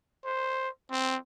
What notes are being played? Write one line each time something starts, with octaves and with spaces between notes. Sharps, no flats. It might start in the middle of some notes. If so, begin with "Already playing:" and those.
C5
C4